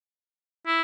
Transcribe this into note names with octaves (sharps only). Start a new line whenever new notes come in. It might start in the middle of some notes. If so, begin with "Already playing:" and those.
E4